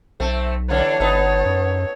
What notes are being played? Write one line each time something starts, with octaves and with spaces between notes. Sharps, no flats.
B1 A3 C4
D3 E3 D4 C#5
G1 B3 D#4 A4
F#2